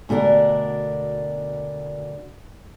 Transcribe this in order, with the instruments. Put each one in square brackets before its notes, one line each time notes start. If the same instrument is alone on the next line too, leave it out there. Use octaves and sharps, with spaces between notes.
[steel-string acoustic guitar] D2 B2 D4 G#4 A#4